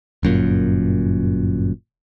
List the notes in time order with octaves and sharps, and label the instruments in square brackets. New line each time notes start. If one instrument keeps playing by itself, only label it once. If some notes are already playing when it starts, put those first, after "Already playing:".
[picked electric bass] G1 F#2 A#2